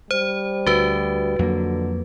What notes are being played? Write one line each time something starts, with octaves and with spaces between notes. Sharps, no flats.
G3 C5
D2 F#4 B4
F2 D3 F#3 A#3